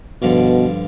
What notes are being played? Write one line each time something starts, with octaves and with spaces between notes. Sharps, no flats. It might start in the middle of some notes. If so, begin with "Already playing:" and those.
G2 B2 D3 F3